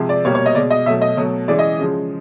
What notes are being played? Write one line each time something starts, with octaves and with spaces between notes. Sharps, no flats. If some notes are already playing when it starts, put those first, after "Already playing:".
Already playing: C3 F3 G#3
D5
B2 G3 A#3 C#5
C#5
D#5
B2 G#3 D5
D#5
B2 F#3 A3 E5
D#5
B2 F#3 A3
C#3 E3 G#3 D5
D#5
C#3 F3 G#3